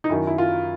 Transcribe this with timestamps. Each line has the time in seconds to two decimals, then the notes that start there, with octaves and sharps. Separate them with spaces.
0.04 D#4
0.09 F#2 D#3 F#3 E4
0.27 E4
0.38 F4